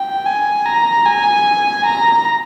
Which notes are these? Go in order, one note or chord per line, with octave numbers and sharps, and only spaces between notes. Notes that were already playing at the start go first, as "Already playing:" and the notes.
Already playing: G5
G#5
A#5
G#5
A#5